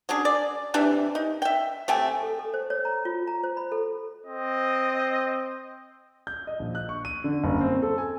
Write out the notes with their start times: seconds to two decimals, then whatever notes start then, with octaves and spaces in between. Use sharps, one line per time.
0.09 F#3 C#4 D4 G#4
0.25 D5
0.74 C3 E3 D4 G4
1.15 D#4
1.42 E5 G5
1.88 C3 A3 G5 G#5
2.23 A4
2.39 A4
2.54 C5
2.70 C#5
2.85 A#5
3.05 F4
3.28 A#5
3.43 C5
3.57 B5
3.72 A4
4.26 C4 D#5
6.27 G6
6.47 D#5
6.59 A#1
6.75 F#6
6.89 C#6
7.05 D#7
7.24 D3
7.44 F#1
7.61 C4
7.82 A4
7.98 G#5